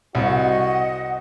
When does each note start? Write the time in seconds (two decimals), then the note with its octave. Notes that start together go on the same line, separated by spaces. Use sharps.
0.15 C2 F#4 D#5 F#5